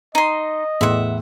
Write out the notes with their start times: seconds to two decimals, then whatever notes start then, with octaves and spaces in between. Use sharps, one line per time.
0.15 D#4 D#5 C6
0.81 E2 A2 E5 F#5 C6